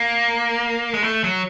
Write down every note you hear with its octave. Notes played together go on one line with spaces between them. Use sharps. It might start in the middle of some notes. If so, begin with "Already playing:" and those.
Already playing: A#3
G#3
A3
F#3